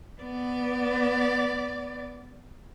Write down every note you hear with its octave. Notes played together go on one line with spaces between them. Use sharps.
B3 D5